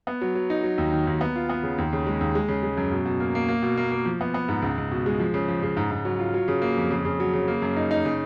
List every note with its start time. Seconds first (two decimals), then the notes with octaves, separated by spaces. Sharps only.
0.07 B3
0.21 F#3
0.35 F#3
0.50 D#4
0.63 F#3
0.78 D#2
0.92 D#3
1.07 D#2
1.21 B3
1.36 F4
1.49 B3
1.63 C#3
1.78 D#2
1.93 C#3
2.07 G#3
2.21 D#2
2.35 G#3
2.48 C#3
2.63 G#3
2.77 F#2
2.92 B2
3.05 B2
3.20 A#3
3.35 A#3
3.48 A#3
3.62 B2
3.77 A#3
3.91 A#3
4.05 F3
4.21 B3
4.34 B3
4.48 G#2
4.62 C#2
4.78 C#2
4.91 B2
5.06 G#3
5.20 F3
5.34 C#3
5.48 F3
5.63 C#3
5.77 G#2
5.91 G#2
6.05 F#3
6.19 F4
6.34 F#3
6.48 C#3
6.62 A#3
6.77 F2
6.91 C#3
7.05 C#3
7.20 F#3
7.33 C#3
7.48 A#3
7.62 F#2
7.77 D#4
7.91 D#4
8.05 C#3